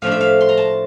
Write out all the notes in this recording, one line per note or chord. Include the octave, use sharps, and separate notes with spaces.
A2 F3 A3 D4 F5
E5
F5
C6
A#5
A5